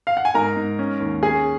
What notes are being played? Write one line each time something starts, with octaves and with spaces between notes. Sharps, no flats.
F5
F#5
G#5
G#2 A#4 A#5
G#2
C#4
D#2
C#4 G#4 G#5